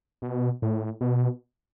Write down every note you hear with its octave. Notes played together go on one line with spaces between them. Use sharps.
B2
A2
B2